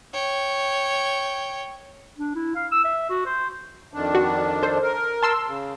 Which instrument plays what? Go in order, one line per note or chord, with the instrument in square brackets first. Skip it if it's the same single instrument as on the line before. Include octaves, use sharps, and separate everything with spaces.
[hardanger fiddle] C#5 G5
[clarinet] D4
E4
F5
E6
E5
F#4
C5
[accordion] F2 D#3 D4
[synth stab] F#4
A4 C5
[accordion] A#4
[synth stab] A5 C6 E6
[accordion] C#3